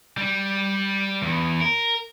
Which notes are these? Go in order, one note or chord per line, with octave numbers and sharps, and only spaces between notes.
G3
E2
A#4